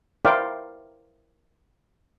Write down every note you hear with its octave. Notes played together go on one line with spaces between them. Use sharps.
E4 A#4 C5 D5 F5 G5